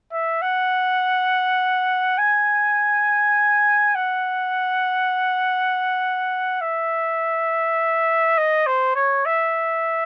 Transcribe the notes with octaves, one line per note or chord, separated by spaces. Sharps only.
E5
F#5
G#5
F#5
E5
D#5
C5
C#5
E5